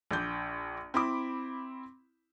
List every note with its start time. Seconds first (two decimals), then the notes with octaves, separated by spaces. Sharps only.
0.11 A#1 D4 G6
0.94 C4 E4 B5 D6